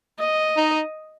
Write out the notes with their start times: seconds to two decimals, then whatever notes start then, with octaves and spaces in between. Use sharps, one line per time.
0.19 D#5
0.57 D#4